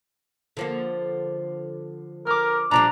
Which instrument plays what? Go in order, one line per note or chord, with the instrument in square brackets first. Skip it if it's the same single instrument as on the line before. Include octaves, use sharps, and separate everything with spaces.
[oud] D3 F3 A#3
[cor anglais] A#4 [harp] D6 F6
[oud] A#2 F3 G3 [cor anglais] D4 [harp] A#5